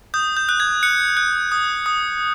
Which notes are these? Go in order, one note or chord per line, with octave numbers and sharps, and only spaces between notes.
D#6 G6
G6
F#6
G#6
F#6 C#7
F#6
D#6
D#6